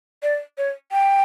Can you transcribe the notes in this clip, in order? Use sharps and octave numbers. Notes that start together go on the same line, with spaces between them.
D5
C#5
G5